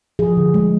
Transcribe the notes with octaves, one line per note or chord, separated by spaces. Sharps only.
F3 G#4
D3
G#3